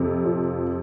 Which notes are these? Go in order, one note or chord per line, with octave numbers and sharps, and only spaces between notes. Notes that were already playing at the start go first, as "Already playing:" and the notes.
Already playing: F2 C3
F3